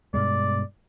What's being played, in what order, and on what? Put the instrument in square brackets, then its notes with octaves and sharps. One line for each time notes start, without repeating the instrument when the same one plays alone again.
[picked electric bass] G2 B2 G#3 [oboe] D5